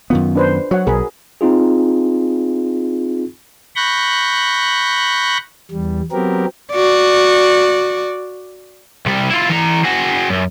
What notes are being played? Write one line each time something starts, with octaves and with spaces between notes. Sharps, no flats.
F#2 D#3 B3 F4
D4 B4 C5
F#3 F#4 C#5 F#5
B1 G#4 A#4 B5
C4 D#4 F4 G#4
B5 C#6 F#6 G6 A#6
E2 G3
F#3 B3 C4 G4 A#4
F#4 D5
C2 G3
E4 F4
E3 A#5
F#4 G#4
F#2